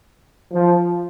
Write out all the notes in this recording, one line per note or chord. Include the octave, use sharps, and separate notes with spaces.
F3